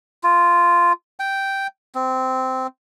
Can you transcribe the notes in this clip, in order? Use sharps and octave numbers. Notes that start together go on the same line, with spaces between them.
F4
G5
C4